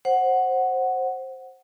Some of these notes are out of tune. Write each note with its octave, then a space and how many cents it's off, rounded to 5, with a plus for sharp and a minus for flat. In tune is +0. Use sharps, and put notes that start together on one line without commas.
C5 +15 F#5 +0